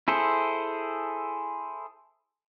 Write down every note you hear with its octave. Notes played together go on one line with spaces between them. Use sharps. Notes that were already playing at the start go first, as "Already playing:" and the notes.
E4 G#4 A4 C5